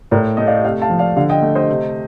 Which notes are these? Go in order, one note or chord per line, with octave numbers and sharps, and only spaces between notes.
A2 A#4 D5
A3 D#5
D5 F5
C3 D5 F5
F5 A5
F3
D5 F5
D3 D5 F5
D#5 G5
A3
C5 D#5
C3